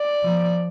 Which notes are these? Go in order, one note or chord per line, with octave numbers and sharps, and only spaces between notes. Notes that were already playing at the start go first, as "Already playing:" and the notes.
Already playing: D5
F3